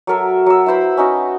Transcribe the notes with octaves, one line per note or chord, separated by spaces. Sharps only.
F#3 A4 A#4 E5
F#3 E6
E4 B4 C5 B5
C#4 D#4 F#4 D#5